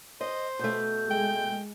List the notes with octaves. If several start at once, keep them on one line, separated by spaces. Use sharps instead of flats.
C5 D#5
B2 A3 G6
G#3 G5